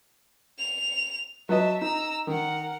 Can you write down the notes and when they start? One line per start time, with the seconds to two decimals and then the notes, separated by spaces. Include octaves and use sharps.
0.58 F7
1.49 F#3 B4 D#5 E5 A5
1.81 D#4 A#5 E6
2.27 D#3 A#4 F#5